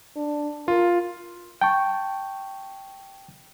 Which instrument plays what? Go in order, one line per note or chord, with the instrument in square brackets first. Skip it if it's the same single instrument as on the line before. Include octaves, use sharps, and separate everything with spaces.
[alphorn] D4
[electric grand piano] F4 [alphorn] A#4
[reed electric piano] G5 A5 C#6